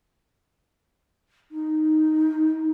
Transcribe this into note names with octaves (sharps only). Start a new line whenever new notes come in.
D#4